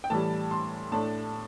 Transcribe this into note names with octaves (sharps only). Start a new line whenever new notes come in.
G5
A2 E3 G3 A5
C6
A2 A3 D4 A5